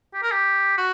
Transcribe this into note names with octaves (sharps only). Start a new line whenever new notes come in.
G4
A#4
G4
F#4